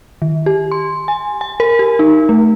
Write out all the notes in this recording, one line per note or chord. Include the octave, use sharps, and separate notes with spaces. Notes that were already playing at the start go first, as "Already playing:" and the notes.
D#3
G4
C6
G#5
G#5
A#4
G4
D#4
A3